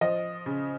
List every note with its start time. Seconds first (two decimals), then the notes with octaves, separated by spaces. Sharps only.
0.01 F3 D#5
0.46 C#3